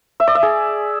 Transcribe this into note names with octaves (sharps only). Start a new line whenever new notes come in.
E5
D5
E5
G#4